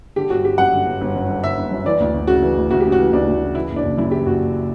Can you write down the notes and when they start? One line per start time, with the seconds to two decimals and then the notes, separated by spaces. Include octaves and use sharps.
0.16 D3 G4
0.29 G1 F#4
0.44 G1 G4
0.58 F#2 F#5
0.73 D3
0.86 G1
1.01 G1
1.15 F#2
1.29 D3
1.43 G1 E5
1.57 G1
1.71 F#2
1.85 E3 D5
2.00 D2
2.14 D2
2.27 C#3 F#4
2.42 E3
2.56 D2
2.71 D2 F#4
2.80 C#3 G4
2.92 F#4
2.99 E3
3.13 D2 D4
3.28 D2
3.41 C#3
3.55 E3 E4
3.69 F#1
3.76 D4
3.83 F#1
3.98 F#2 E4
4.11 E3 G4
4.26 F#1 F#4
4.40 F#1